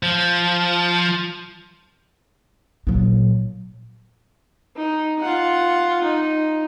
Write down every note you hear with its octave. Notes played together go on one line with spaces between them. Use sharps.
F3
A#2 F#3
D#4
F4 F#5
D#4